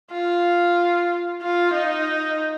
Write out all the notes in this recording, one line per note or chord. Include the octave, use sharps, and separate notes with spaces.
F4
F4
D#4